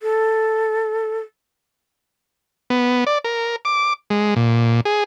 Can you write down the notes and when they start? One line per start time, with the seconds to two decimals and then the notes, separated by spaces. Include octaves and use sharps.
0.03 A4
2.70 B3
3.07 D5
3.24 A#4
3.65 D6
4.10 G#3
4.36 A#2
4.85 G#4